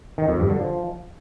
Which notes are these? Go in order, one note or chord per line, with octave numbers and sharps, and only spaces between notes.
D#3
F2
G2
D3
F3